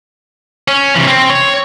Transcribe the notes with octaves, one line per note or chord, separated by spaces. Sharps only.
C#4
C3 E3
C4
C#5